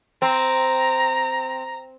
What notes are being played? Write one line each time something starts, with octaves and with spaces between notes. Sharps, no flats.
C4 A#5